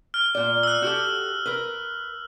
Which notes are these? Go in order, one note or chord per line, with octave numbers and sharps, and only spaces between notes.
F6
A#2 D5
E6 F#6
F#4 G4 A4
A#4 B4